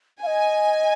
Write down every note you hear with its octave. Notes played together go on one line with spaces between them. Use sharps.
D#5 F5 G#5